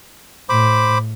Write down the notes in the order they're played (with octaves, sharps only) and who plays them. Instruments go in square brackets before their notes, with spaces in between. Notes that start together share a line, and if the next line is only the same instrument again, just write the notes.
[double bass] A2 [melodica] C5 B5 D6